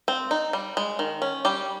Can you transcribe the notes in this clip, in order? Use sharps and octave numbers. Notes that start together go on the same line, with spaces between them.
C4
D#4
G3
G#3
D#3
C#4
G3 G4